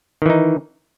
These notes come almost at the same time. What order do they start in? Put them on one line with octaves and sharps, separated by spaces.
D#3 E3 D#4